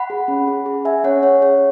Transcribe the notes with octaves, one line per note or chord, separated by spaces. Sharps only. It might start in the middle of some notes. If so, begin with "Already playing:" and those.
Already playing: F#5 B5
G#4
C#4
G#4
G#4
G#4 E5 G#5
C#4 C#5 F#5
G#4 C#5
G#4 C#5